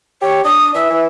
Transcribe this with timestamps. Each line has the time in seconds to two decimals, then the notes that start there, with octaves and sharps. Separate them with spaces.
0.22 G4 C#5
0.44 D4 D#6
0.74 E3 E5
0.90 E3